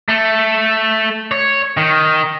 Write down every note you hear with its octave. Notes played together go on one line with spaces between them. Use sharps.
A3
C#5
D#3